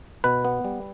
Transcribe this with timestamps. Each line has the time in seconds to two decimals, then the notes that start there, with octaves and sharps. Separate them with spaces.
0.24 B2 B4
0.45 B3
0.65 G3